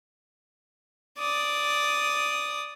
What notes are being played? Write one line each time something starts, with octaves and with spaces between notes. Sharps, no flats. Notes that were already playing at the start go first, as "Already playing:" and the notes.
D5 D#6